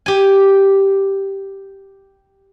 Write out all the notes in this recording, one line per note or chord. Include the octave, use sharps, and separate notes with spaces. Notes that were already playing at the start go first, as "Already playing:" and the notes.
G4 G#5